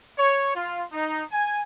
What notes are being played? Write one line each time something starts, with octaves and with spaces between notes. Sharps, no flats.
C#5
F4
D#4
G#5